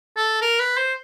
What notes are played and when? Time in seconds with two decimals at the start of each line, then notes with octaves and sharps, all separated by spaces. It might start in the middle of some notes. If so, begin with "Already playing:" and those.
0.17 A4
0.42 A#4
0.60 B4
0.77 C5